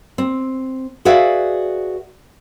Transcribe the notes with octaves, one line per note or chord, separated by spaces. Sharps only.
C4
F#4 G#4 B4 D5 E5 F5